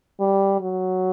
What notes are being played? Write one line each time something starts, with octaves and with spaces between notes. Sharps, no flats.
G3
F#3